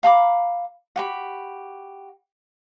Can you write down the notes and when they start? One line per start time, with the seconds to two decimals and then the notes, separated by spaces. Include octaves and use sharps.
0.03 F5 A#5 B5 D6
0.96 F#4 G4 B5